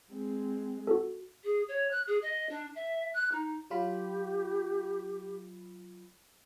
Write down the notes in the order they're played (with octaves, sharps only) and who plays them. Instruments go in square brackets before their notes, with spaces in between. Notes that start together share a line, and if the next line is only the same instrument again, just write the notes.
[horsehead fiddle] G#3 C4
[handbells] F#4 A4
[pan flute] G#4
C#5
F#6
G#4
D#5
D4
E5
F#6
D#4
[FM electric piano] F#3 F4 B5 [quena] G4